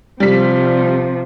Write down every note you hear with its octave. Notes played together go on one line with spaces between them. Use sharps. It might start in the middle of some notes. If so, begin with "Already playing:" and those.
C3 F3 G3 B6